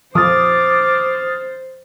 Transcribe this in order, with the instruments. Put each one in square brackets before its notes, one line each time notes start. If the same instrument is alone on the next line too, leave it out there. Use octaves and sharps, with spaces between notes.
[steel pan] F3 [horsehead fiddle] C5 [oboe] D6 [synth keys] D#6 F6 A6